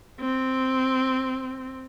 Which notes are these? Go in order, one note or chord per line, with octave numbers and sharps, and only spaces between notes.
C4